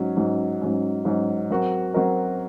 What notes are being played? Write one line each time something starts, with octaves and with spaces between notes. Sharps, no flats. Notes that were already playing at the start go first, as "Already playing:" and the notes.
Already playing: G#2 F#3 C#4
G#2 F#3 C#4
G#2 F#3 C#4
G#2 F#3 C#4
F#3 C4 F#4 A#4
F#3 C4 F#4 A#4